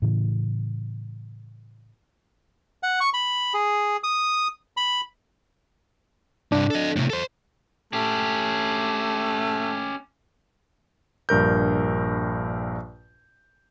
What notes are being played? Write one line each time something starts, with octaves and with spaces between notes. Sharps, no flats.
A2 C#3 E3
F#5
C#6
B5
G#4
D#6
B5
C2 G2 D4
A4 D#5
A2 C3
A4 C5
A3 C#4 G4
A#1 G2 A#4 G6